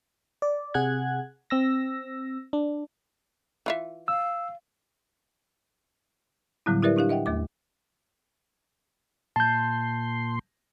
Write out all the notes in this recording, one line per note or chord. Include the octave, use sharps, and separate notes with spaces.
D5
C3 G#4 F#5 F#6 G#6
C4 E6 A#6
D4
E3 F4 E5
F5 E6
A2 D3 F#3 G3 B3 E4
E4 G4 A#4 B4 D5 E5
D4 E4 G4 F5
D#5 E5 F#5 G5
D#2 A3 D6
A#2 A5 C6 G6